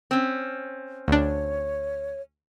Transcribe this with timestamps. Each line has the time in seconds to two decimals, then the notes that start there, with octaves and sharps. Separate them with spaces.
0.11 C4 C#4
1.08 D2 D4 C#5